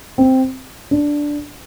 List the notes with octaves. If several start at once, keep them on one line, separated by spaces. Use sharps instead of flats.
C4
D4